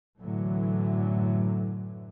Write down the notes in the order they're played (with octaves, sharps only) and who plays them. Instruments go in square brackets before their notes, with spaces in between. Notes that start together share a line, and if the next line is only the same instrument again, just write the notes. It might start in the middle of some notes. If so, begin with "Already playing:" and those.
[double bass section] F#2 A2 D3 E3 F#3